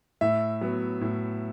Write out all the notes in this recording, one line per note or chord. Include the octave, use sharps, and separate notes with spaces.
A2 E5
F#3 B3
A2